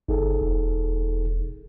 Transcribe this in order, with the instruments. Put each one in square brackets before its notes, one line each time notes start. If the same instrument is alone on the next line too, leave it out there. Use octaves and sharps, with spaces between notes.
[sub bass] G1 [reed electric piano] D#4 G#4 A4
[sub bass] E1